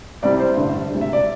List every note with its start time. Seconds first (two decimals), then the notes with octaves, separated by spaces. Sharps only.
0.23 C2 C3 G3 C4 D5
0.40 C5
0.57 A1 G2 D3
0.91 E1 D2 C3
1.01 E5
1.13 D5